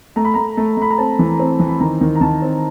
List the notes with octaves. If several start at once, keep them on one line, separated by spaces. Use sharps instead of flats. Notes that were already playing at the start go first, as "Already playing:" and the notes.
A3 A#5
B5
A3 A#5
A3
A3 B5
A#5
C4 A5
E3
C4
E3
B5
D#3 A#5
D#3
A#5
D#3 A5
C4